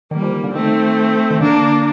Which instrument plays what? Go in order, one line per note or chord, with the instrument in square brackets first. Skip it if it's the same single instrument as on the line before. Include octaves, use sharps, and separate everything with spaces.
[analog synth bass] D#3 [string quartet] G3 A#3
[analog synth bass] F3
D#3
D3
[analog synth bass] D#3 [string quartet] A3 C4
[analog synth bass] D#3
[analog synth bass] D3 [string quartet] A#3 D4